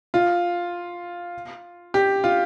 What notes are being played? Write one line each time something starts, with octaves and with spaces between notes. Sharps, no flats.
F4
G4
F4